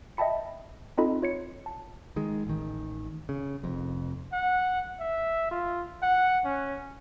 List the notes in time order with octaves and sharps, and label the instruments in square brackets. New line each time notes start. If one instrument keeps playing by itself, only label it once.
[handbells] D#5 E5 G5 A5 B5 C#7
C4 D#4 F4 A4 D#5 B5
F4 C#5 C#7
A5
[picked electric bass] D#3 G#3
A1 D#3
C#3
F1 F2
[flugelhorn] F#5
E5
F4
F#5
C#4